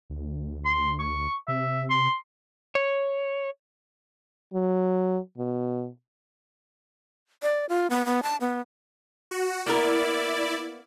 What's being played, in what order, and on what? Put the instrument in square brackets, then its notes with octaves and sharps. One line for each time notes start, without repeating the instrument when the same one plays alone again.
[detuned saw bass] D2
[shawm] C6
C#6
[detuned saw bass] C3 [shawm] E5
[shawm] C6
[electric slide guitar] C#5
[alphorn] F#3
B2
[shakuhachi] D5
F4
B3
B3
A5
B3
[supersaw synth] F#4
[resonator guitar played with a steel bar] A#3 B3 A#4 [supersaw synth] E4 D5